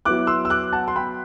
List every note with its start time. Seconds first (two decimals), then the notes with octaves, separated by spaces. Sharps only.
0.05 F#3 B3 E4 D6 F#6
0.27 C6 E6
0.45 E6
0.50 D6 F#6
0.73 F#5 A5
0.88 C6
0.96 G5 B5